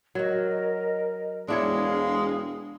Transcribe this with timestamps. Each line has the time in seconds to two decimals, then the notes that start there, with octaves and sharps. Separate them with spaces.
0.15 F#3 F#4 A#4 D#5
1.48 E1 G#3 D4 E4 C#5 F5